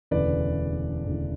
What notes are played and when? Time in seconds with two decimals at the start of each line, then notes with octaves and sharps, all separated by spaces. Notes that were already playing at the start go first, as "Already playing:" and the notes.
0.11 E1 D2 C#3 E3 B4 D5
1.06 E1 D2 C#3 E3